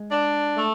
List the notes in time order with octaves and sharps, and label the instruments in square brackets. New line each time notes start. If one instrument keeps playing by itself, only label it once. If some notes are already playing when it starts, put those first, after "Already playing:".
Already playing: [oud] G#3
[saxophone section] D4
A3